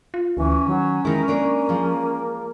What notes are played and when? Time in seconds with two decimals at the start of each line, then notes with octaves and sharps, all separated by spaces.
0.14 F4
0.37 D2 E3 C#4
0.66 D#3 F#3
1.05 D#3 G#3 D#4 E4 A#4
1.28 A#3 D4 A#4 C#5
1.69 F3 G#4